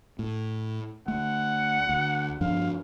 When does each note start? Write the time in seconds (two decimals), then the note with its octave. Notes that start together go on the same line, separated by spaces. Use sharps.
0.19 A2
1.08 D2 A3 F#5
1.89 D2
2.41 G2 F3 D4 F5